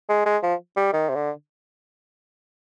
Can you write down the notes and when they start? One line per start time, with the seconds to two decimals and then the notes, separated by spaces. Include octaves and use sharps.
0.09 G#3
0.25 G#3
0.42 F3
0.76 G3
0.93 D#3
1.09 C3
1.15 D3